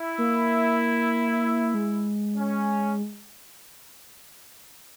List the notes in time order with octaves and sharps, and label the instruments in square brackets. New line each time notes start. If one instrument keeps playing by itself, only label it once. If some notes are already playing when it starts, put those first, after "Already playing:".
Already playing: [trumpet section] E4
[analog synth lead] A#3
G#3
[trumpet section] C#4